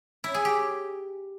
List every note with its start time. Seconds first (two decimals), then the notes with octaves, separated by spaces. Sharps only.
0.24 E4
0.34 G#4
0.45 G4